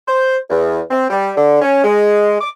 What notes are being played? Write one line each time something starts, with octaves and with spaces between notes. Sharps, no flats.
C5
E2
C4
G3
D3
C#4
G#3
D6